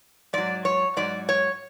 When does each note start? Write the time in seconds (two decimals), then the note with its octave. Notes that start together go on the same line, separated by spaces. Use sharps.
0.33 G#2 F#3 D5
0.65 C#5
0.97 G#2 F#3 D5
1.29 C#5